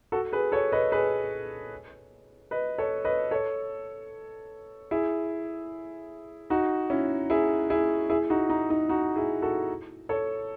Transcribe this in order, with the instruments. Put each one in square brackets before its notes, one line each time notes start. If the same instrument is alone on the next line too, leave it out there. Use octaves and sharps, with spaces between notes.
[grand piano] F#4 A4
G#4 B4
A4 C#5
B4 D#5
G#4 B4
B4 D#5
A4 C#5
B4 D#5
A4 C#5
E4 G#4
D#4 F#4
C#4 E4
E4 G#4
E4 G#4
E4 G#4
D#4 F#4
D#4
D#4
D#4 F#4
E4 G#4
F#4 A4
A4 C#5